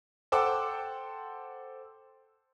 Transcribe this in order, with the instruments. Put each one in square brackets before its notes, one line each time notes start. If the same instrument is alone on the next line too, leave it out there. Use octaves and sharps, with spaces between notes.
[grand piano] A4 C5 F#5 G5 D6 E6